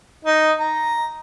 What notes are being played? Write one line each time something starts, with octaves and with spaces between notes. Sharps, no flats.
D#4
A#5